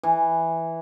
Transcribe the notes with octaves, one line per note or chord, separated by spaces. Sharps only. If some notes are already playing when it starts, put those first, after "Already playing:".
E3